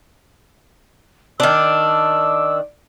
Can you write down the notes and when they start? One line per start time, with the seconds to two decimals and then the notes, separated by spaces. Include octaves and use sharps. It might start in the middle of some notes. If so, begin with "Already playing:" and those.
1.40 D#3 D4 E6